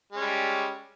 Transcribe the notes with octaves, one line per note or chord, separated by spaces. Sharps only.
G3 G#3 C#4